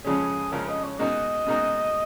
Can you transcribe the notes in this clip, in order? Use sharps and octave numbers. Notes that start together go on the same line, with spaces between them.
F2 C#3 F3 G#3 C#4 G#4
F2 C#3 F3 G#3 C#4 A#4
D#5
C#5
B2 G#3 D#4 F#4 A#4 D#5
B2 G#3 D#4 F#4 A#4